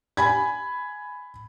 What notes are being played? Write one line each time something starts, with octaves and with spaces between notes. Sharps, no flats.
G#5 B5 G#6